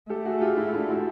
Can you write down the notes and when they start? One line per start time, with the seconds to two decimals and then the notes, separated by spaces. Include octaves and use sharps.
0.09 A3 G4 A4
0.25 F#4 G#4
0.41 F4 G4
0.57 E4 F#4
0.73 D4 E4
0.89 E4 F#4